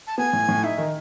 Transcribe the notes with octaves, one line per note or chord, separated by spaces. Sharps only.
A5
B3 G#5
A2
A2
D#4 E5
D#3